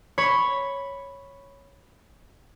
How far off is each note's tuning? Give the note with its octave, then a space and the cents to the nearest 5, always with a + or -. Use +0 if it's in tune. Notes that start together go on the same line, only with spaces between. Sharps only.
C#5 +0 B5 +0